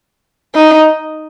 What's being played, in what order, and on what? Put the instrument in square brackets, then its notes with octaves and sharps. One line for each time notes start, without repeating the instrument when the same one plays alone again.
[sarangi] D#4